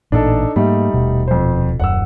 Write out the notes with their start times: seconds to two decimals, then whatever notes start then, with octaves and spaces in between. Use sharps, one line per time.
0.12 A1 A#2 D4 D#4 A4
0.56 G#2 G3 A3 A#3 D#4
0.94 D#1 B2
1.28 F2 C5
1.80 D#1 F#2 F#5 E6